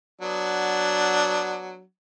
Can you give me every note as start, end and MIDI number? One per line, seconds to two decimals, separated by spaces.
0.21 1.82 54
0.21 1.82 59
0.21 1.82 62